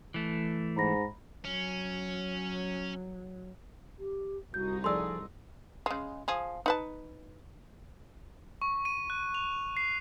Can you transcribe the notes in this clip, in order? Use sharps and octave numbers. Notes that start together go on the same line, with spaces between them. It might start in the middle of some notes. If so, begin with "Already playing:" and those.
E3 A3
G#2 A#5 B5 A#6
F#3 C#4
G4
C2 D#4 F#4 G6
F3 A3 G#4 D5 C6 E6
C#3 G#3
F3 G#4
D#4 B4 A5
C#6
D#7
F#6
F7
C7